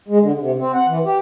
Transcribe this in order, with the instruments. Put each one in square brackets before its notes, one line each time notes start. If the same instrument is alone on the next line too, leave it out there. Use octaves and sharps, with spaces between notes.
[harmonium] G#3
D3
C3
C4
F#5
E3
G4